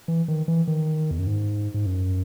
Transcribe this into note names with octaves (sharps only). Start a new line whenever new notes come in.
E3
D#3
E3
D#3
E2
F#2
G#2
G#2
F#2